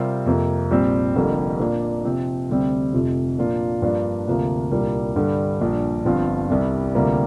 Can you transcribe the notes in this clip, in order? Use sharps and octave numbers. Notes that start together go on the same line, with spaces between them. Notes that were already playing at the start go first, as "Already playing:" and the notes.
Already playing: C3 G3 C4 F4 A#4
F2 C3 F3 A#3
A#1 A#2 G3 C4
F1 F2 D3 G3 A#3
A#2 A#3 D4 A#4
C3 F3 C4
D2 C3 G3 C4
F1 F2 C3 F3
A#2 F3 A#3 D4 F4
G2 F3 A#3 D4
D2 C3 F3 A#3 F4
C2 A#2 G3 A#3 D4
G2 D3 G3
A#1 A#2 G3 D4
G1 G2 F3 C4 F4
C2 C3 G3
D2 C3 G3 A#3 F4